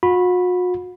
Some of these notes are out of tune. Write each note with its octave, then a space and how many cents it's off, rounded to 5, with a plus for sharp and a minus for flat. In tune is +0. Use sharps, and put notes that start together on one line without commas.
F#4 -45 B5 +0